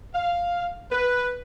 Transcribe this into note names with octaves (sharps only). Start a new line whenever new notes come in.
F5
B4